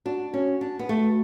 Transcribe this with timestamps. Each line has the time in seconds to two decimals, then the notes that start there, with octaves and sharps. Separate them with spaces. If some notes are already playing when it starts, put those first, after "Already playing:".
0.05 D4 F#4
0.34 C#4
0.61 D4
0.79 B3
0.89 A3